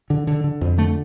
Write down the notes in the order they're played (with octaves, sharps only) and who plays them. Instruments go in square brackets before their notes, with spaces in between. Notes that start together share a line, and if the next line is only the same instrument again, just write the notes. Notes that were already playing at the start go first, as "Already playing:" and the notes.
[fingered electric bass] D3
D3
D3
F2
D3 A3